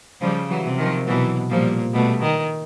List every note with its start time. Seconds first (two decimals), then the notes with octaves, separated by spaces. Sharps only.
0.21 C#3 F3 G3
0.50 E3 F#3
0.65 C3
0.79 D#3 F3
1.07 B2 E3 F#3
1.50 A#2 F3 G3
1.93 B2 G3 A3
2.22 D#3